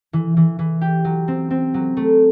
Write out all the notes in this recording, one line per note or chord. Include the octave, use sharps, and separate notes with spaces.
E3
E3
E3
G4
F#3
C4
C4
F#3
A3